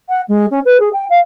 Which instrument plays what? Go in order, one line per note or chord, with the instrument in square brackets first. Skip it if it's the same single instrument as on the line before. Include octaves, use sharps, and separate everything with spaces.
[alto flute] F#5
G#3
C#4
B4
G#4
G5
F5